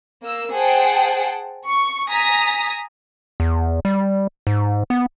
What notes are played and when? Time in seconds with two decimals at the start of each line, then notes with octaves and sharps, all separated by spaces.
0.24 A#3 E6
0.53 G#4 C5 F#5 G5 A5
1.68 C#6
2.08 G#5 A#5 D#6 B6
3.40 E2
3.85 G3
4.47 G#2
4.90 B3